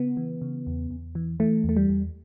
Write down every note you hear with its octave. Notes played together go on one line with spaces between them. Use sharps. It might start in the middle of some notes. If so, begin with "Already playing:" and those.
Already playing: C#3 B3
E3
C#3
E2
E2
E3
E3 A3
E2 A3
G3
E2